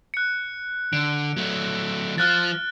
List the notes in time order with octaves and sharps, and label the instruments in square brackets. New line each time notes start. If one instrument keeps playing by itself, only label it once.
[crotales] F#6 C#7
[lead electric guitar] D3 [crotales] D7
[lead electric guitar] F#3 A3
[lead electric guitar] F3 F4 [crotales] F6 F#6 A6